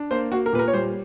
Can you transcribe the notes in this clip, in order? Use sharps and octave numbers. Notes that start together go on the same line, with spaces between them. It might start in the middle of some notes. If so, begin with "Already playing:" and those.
Already playing: D4
A#3 C5
A#3 F#4
A#4
A#2 B4
A#4
C#5
G3 C5